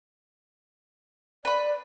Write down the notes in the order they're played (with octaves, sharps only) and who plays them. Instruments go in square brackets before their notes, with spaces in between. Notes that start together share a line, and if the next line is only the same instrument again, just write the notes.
[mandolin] B4 B5 [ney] D5